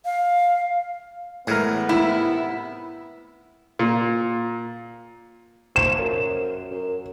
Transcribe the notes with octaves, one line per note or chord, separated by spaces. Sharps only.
F5
A2 E3 G#3 B3 G#4 A#4
C3 E4
A#2
F3 E7
F#2
F#2